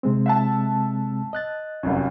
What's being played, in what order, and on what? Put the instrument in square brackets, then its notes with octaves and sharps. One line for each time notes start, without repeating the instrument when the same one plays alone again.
[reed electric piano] C3 G#3 C4
[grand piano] E5 F#5 A5
[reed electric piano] D#5 F#6 A6
[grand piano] F1 C2 F#2